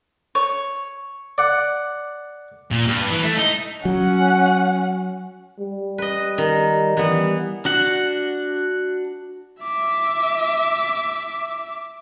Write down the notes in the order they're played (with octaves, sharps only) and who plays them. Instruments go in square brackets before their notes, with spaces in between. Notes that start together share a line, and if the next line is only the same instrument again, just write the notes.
[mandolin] C#5
[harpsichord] D5 F#5
[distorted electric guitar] A#2
G2
E3
A3
D#4
[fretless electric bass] F#3 [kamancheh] C#4 F#5
[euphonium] G3
[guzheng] B4 D#5
D#3
[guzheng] E3 B3 [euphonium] G3
[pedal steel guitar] D4 F#4 F#5
[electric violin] E5 D6